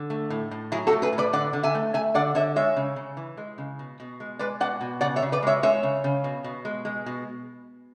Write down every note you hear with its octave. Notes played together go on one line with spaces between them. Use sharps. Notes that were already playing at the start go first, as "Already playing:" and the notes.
Already playing: D3
A3
A2
A2
F#3 E4 G#4
F#4 A4
A3
G#4 B4
A2
B4 D5
D3 D5 F#5
D3
E5 G#5
A3
A3 E5 G#5
D3 D5 F#5
D3 C#5 E5
G#3 C#5 E5
C#3
C#3
E3
G#3
C#3
B2
B2
G#3
G#3 B4 D5
B2 D5 F#5
B2
C#3 D5 F#5
C#5 E5
C#3
B4 D5
G#3 C#5 E5
G#3 C#5 E5
C#3
C#3
B2
B2
G#3
G#3
B2